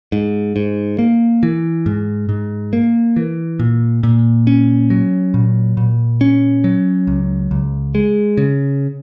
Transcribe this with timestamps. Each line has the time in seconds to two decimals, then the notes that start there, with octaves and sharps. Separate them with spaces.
0.12 G#2
0.56 G#2
0.99 A#3
1.43 E3
1.86 G#2
2.29 G#2
2.73 A#3
3.16 E3
3.59 A#2
4.03 A#2
4.47 C#4
4.90 F#3
5.34 A#2
5.77 A#2
6.21 C#4
6.64 F#3
7.07 C#2
7.51 C#2
7.95 G#3
8.37 C#3